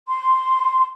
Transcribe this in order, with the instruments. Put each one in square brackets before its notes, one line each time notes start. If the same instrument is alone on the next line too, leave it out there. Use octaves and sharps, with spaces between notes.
[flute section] C6